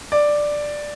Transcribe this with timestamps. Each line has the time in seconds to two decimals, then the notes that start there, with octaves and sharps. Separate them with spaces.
0.12 D5